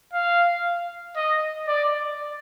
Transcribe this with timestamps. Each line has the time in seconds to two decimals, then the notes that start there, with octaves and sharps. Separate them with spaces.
0.13 F5
1.16 D#5
1.68 D5